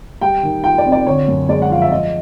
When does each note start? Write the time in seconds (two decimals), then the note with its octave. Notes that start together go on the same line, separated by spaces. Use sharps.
0.21 G3 G5
0.43 D#3
0.64 F4 G5
0.78 D5
0.85 C4
0.92 D5
1.06 D3 C#5
1.28 F#2
1.49 G#3 D5
1.62 F#5
1.70 F3 F5
1.82 E5
1.91 F3 D#5